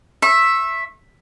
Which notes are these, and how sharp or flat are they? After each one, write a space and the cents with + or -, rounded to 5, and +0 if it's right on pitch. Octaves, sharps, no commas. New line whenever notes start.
E5 +0 C#6 -35